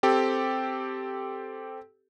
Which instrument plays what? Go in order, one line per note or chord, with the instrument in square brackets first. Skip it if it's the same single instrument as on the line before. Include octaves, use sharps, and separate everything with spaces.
[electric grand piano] C4 G4 A4